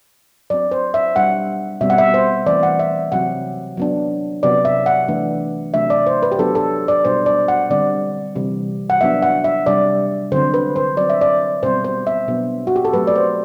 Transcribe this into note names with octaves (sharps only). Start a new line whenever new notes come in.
F#3 C4 D5
C5
E5
B2 G3 D4 F#5
B2 G3 C4 E5
F#5
E5
C5
E3 A3 C4 D5
F#5
E5
C3 F#3 C4 F#5
F#3 B3 D4
C3 F#3 B3 D5
E5
F#5
E3 A3 D4
C3 F#3 A3 D4 E5
D5
C5
B4
G4
F#3 B3 D4 A4
A4
D5
B2 G3 D4 C5
D5
F#5
D3 G3 C4 D5
C3 E3 G3
F#5
F#3 B3 D4 E5
F#5
E5
C3 G3 D4 D5
D3 F#3 C4 C5
B4
C5
F#3 C4 D5
E5
D5
B2 G3 C4 C5
C5
E5
B2 F#3 B3 D4
F#4
G4
A4
F#3 A3 C4 B4
D5
C5